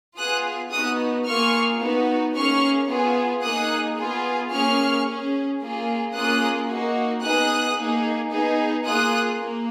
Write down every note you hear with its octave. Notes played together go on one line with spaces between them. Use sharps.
B3 F4 G#4 D#6 F#6
B3 D#4 F#4 D#6 F#6
A#3 F4 G#4 C#6 F6
B3 D#4 F#4
A#3 C#4 G#4 C#6 F6
B3 F4 G#4
A#3 D#4 G#4 D#6 F#6
B3 F4 G#4
A#3 C#4 G#4 C#6 F6
C#4 G#4
A#3 F4 G#4
A#3 C#4 F4 G#4 D#6 F#6
A#3 D#4 F#4
B3 D#4 G#4 D#6 F#6
A#3 D#4 G#4
B3 D#4 G#4
A#3 F4 G#4 D#6 F#6
A#3